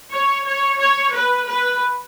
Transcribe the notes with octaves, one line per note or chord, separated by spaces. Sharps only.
C#5
C#5
C#5
B4
B4